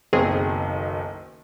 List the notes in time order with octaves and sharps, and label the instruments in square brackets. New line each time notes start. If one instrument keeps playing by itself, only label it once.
[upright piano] F#1 B1 D#3 [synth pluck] C4 G#4